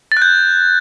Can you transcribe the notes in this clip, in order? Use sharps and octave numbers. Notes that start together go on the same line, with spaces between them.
A6
F#6
G6